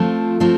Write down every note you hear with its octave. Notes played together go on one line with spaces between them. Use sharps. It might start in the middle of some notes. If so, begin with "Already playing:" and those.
Already playing: F3 A3 C4 F4
F3 A3 C4 F4